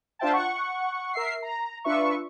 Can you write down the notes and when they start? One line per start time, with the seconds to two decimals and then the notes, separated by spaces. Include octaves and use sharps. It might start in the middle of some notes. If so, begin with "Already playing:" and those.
0.19 D4 F4 C5 E5 G5 A5
0.33 F#5 C#6
1.13 A#4 E5 C7
1.42 A#5
1.84 D4 F4 B4 E5 C#6